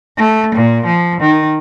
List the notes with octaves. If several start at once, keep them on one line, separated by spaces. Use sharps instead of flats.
A3
A#2
F3
D#3